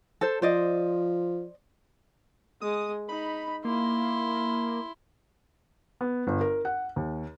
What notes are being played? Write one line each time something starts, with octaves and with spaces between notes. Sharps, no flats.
A4 C5
F3 C5 D5 D#5
G#3 D#6
D#4 B5
A#3 E4 C6
B3
G1
A#4
F#5
D#2